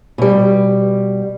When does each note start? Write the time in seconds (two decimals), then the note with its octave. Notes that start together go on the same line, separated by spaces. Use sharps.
0.18 B2 G3